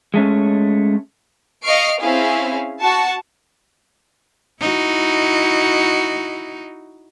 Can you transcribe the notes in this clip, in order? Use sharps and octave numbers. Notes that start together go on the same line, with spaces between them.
G#3 A3 C#4
D#5 F5 C#6 F6 C7 D7
C4 C#4 E4 G#4 F5
F#4 F#5 A5 C#6
D#4 E4 F#4